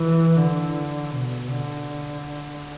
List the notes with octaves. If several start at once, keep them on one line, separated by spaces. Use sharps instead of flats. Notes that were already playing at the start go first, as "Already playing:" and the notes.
Already playing: E3
D3
B2
D3